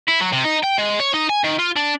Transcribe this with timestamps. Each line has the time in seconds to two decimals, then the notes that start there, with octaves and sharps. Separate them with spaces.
0.08 E4
0.21 F#3
0.33 C3
0.45 D#4
0.64 G5
0.79 G#3
1.00 C#5
1.14 D#4
1.29 G#5
1.44 D#3
1.59 F4
1.76 D4